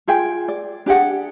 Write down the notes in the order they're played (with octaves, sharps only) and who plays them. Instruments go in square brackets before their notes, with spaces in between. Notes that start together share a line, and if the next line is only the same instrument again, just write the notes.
[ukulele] F4 G#4 G5
D5
D4 G4 G#4 F#5